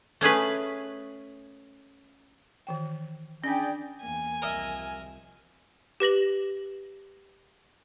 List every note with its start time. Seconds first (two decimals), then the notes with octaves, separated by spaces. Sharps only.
0.21 A3 C#4 G#4 B4
2.67 D#3 E3 G5
3.44 C#4 D4 G#4 D5 G5
4.02 E2 A#3 G#5
4.42 C2 F3 A#4 D#5 E5
6.00 G4 B4 A#6 F#7